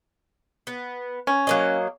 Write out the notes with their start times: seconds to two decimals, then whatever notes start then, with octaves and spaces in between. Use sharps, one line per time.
0.67 B3
1.27 C#4
1.47 F#3 A#3 D#5